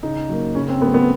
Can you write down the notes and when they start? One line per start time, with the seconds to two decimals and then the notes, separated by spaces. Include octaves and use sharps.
0.03 C#3 D#4
0.29 F#3 A#3
0.55 C#3 C#4
0.68 C4
0.81 F#3 A3 B3
0.94 B3